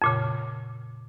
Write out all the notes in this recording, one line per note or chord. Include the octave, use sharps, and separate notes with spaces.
F2 A#2 C#3